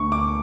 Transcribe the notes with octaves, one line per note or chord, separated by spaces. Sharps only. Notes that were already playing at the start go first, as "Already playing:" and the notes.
Already playing: D2 D3 C#6
D6